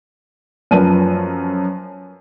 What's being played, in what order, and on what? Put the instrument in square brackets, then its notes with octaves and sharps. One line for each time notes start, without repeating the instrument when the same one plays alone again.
[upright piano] F#2 F3 A#4 B4 A5 D#7